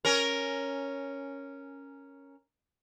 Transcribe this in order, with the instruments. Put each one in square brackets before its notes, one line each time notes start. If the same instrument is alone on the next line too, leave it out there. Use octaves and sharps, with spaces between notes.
[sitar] C#4 A#4